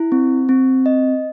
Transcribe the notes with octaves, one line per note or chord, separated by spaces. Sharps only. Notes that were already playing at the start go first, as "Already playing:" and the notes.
Already playing: E4
C4
C4
D#5